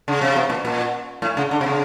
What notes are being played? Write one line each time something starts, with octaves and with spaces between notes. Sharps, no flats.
C#3
C3
B2
A#2
A#2
A2
C#3
D3
C3
C#3